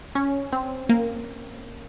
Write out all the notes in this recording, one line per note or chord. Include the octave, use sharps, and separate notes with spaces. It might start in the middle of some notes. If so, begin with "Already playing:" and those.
C#4
C4
A#3